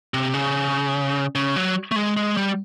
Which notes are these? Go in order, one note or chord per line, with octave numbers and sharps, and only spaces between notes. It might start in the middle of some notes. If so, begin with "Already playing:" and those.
C3
C#3
C#3
F#3
A3
G#3
G#3
G3